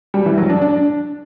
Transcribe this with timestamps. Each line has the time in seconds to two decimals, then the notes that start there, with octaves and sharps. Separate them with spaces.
0.14 G3
0.26 E3
0.38 F#3
0.50 D4
0.62 D4